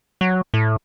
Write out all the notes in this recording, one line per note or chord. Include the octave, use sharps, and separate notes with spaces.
F#3
A2